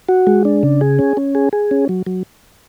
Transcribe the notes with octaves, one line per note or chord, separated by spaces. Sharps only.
F#4
G#3
D4
C#3
G#4
C#4
C#4
G#4
G#4
C#4
F#3
F#3